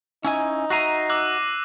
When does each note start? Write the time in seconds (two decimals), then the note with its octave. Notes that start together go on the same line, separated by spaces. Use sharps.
0.24 C#4 D#4 E4 G#5
0.70 F#4 E5 A#5 A#6 C7 D#7
1.10 D6 E6 F#6